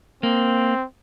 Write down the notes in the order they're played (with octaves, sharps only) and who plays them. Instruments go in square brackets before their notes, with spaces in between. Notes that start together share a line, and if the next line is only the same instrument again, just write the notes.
[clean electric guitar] A#3 [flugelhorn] C4